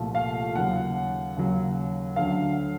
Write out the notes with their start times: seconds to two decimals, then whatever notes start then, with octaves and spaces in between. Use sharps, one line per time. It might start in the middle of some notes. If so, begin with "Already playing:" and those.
Already playing: C2 A#2 F3 A3
0.15 F5
0.55 D#2 C#3 F#3 F#5
1.36 D#2 C#3 F#3
2.16 D2 D3 F#3 F5